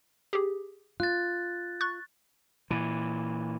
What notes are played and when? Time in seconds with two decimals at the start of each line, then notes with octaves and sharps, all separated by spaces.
0.33 G4 G#4
1.00 F4 F#6 A6
1.81 C#6 F#6 A6
2.71 A#2 E3